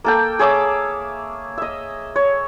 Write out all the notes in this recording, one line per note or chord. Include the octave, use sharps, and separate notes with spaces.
A#3 A4 G5
G#4 C#5 E5 D6
D#5 E5
C#5